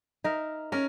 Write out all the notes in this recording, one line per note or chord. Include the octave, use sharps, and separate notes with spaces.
D#4 A#4 E5
C#4 A#4